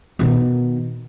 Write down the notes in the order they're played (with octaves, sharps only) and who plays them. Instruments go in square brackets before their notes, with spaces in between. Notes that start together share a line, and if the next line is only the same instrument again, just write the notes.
[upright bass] B2 D#3